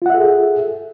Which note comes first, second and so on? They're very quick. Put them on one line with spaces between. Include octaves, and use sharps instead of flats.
F4 F#5 E5 A4 G#4